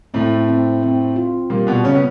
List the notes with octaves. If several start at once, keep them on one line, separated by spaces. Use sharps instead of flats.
A2 A3 C4
C4
C4
F4
A#2 G3 A#3
B2 B3
A#2 C#3 C#4
B3